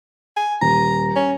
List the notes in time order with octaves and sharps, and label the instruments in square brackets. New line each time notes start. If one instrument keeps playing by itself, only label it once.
[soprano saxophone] G#5
[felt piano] D#1 [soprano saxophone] A#5
[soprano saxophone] C#4